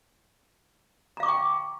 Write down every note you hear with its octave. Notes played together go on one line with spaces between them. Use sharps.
F5 G5 A#5 C#6 D6